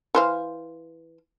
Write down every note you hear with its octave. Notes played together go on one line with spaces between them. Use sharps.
E3 C5 F5